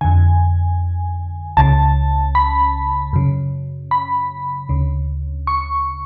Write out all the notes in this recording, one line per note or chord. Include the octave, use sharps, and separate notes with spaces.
F2 D3 G#5
C#2 C#3 A5
B5
F#2 C#3
B5
D2 C#3
C#6